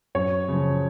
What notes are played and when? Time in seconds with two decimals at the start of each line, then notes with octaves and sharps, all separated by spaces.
0.15 F#2 C#5
0.48 C#3
0.53 F3